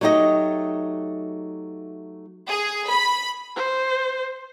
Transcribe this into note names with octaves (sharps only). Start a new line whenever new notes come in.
F#3 A3 D#4 G4 D#5
G#4
B5
C5